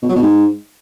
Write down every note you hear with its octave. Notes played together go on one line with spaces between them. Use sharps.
B2
F#3
B2
G#2